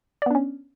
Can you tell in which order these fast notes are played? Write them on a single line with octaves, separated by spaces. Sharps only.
D5 B3 D4 C#4